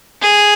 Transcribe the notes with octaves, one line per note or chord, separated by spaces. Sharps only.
G#4